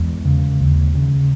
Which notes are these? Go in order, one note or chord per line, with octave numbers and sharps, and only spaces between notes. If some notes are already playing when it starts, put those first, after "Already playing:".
Already playing: E2 G#3
C#3
D#2
C#3